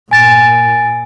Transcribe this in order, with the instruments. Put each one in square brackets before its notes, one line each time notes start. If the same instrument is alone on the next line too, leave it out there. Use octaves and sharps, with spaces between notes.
[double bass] A#2 [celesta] G#5 A6 D7